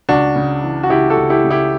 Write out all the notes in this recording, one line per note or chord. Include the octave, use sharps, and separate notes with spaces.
C#2 D4 F#4
C#3
E3
F#4
C#2 E4 G4
F#4 A4
C#2
E4 G4
C#3
E4 G4